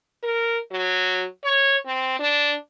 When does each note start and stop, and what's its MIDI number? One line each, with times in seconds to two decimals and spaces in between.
0.23 0.59 70
0.71 1.25 54
1.44 1.76 73
1.86 2.17 60
2.20 2.56 62